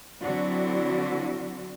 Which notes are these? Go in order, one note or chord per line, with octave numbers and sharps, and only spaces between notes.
D3 F#3 C4 D4 E4 F#4